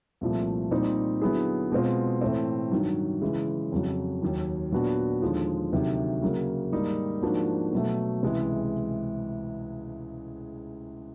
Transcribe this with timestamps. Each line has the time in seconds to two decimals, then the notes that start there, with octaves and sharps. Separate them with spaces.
0.21 C2 A#2 F3 A3
0.71 A#2 G3 C4 D#4
1.22 D3 F#3 B3 E4 G#4
1.72 B2 G#3 C4 F4
2.21 A2 E3 A3 C4
2.72 G2 D#3 F#3
3.22 C#3 E3 G#3
3.72 F2 C#3 F#3
4.22 D#2 D#3 F#3
4.72 A#2 F#3 B3 D4 F#4
5.22 D#2 D3 F3 G#3
5.72 D2 C3 D#3 F#3
6.22 C#3 F#3 A#3
6.72 G#2 D#3 G3 A#3 D#4
7.23 G#2 F3 A#3 D4 F#4
7.72 B2 F#3 A3
8.23 C#2 C3 E3 G#3